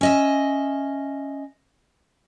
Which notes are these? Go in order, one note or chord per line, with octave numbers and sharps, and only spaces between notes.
C#4 D#5 E5